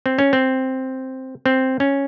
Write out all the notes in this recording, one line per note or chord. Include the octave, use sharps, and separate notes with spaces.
C4
C#4
C4
C4
C#4